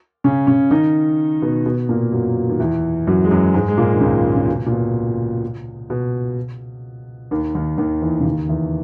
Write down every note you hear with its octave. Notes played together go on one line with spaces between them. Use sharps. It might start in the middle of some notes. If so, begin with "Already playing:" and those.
C#3 C#4
C#3 C#4
D#3 D#4
B2 B3
B2 B3
A#2 A#3
F#2 F#3
D#3
E2 E3
F#2 F#3
G#3
F#2 F#3
G#2 G#3
G#3
A#2 A#3
D#3
C#2 C#3
C#3
B2
A#2
B2
B2
D#2 D#3
D#2 D#3
D#2 D#3
E2 E3
C#3
D#2 D#3
E2 E3